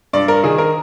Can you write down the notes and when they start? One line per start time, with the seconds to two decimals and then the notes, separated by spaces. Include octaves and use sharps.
0.13 G2 D5
0.28 A#4
0.44 D#3 G#4
0.58 A#4